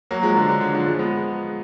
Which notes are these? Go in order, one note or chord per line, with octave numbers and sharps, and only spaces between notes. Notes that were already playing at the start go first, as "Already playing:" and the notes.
F#3 A#3
F3 G#3
D3
D3
D3
D3 F3
F3 G#3
G#3 B3